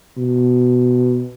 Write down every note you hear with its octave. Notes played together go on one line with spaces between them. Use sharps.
B2